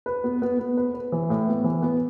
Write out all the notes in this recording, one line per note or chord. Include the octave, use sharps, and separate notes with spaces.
B4
B3
B3
B3
B4
B4
E3
A2
B3
E3
B3